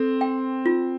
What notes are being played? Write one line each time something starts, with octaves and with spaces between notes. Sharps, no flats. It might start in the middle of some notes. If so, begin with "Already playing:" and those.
Already playing: C4 A4
G5
F4